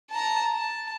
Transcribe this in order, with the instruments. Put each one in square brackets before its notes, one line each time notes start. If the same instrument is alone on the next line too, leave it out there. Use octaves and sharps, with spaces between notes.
[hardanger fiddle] A5 A#5
A5